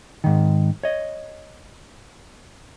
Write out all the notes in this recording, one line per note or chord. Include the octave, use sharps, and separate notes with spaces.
G#2 D#3
C#5 D#5